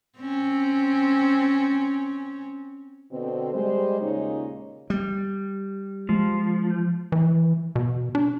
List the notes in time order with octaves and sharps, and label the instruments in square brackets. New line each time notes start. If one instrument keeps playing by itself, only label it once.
[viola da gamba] C4 C#4
[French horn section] B2 D3 C4
G3 G#3 C5
D#2 A#2 C#3 G#3 D#4 C#5
[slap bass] G3
[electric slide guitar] F3 [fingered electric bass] G#3
[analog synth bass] E3
B2
D4